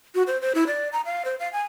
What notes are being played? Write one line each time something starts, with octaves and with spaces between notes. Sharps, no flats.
F#4
C5
C5
E4
D5
A#5
F5
C5
F5
G#5